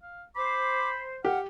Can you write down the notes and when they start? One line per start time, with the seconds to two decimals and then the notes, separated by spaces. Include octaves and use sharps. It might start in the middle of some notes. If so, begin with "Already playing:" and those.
0.03 F5
0.36 C5 B5 D6
1.25 G4 F5 F#5